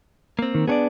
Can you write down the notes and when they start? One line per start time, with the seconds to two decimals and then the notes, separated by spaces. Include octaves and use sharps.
0.39 A#3 C4
0.55 D#3
0.67 B3 D4 G#4 C#5 D5